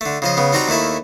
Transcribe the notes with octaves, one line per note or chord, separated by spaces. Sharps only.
D3 A3
C#3 F3 D#5
C#3 B3
G3 C4 D#4 F#4 G5 A#5
D#2 D#3 A3 E4 E5